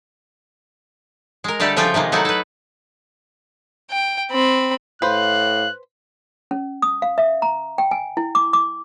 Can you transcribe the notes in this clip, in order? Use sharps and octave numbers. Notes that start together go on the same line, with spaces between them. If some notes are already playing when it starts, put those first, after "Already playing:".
G#3 A#4
D3 G3 A3 G4 A4
C#3 F3 A3 F4 G5 G#5
C3 D#3 G#3 A#3
F#3 A3 D#4 E4 F#4
A4 B4
G5
C4 B5
A2 B4 C5 F5 F#6
C#4
D#6
F5
E5
A#5
G5
G#5
E4
D6
D6